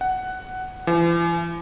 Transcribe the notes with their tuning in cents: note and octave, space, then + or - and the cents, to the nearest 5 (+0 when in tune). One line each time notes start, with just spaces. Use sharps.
F#5 +10
E3 +45